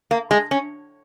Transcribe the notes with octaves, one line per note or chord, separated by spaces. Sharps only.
A#3
G#3
C#4